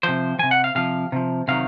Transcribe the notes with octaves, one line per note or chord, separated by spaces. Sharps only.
C3 F3 C5
C3 F3 G#5
F#5
F5
C3 F3 F5
C3 F3
C3 D#3 F#3 F5